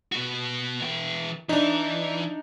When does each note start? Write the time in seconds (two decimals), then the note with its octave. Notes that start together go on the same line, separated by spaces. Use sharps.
0.12 B2 F#4
0.81 E3 G5
1.49 E3 D4 D#4